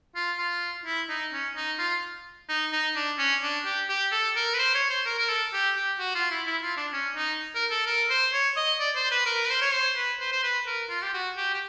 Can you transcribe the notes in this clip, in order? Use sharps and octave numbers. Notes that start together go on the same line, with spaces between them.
F4
F4
E4
D#4
C#4
D#4
F4
D#4
D#4
D4
C#4
D4
G4
G4
A4
A#4
B4
C5
C#5
C5
A#4
A#4
A4
G4
G4
F#4
F4
E4
E4
F4
D4
C#4
D#4
A#4
A4
A#4
C5
C#5
D#5
D5
C5
B4
A#4
B4
C5
C#5
C5
B4
C5
C5
B4
A#4
F4
G4
F#4
G4
G4